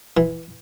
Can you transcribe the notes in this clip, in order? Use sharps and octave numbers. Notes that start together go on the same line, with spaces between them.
E3